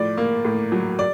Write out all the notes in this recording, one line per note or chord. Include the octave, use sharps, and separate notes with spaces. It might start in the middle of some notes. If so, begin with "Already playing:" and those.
Already playing: A2 F3 D5
A#3
A2
F#3
D5